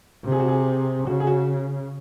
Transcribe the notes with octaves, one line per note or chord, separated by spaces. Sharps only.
C3
G#4
F#4
G#4
C#3 F#4
G#4
F#4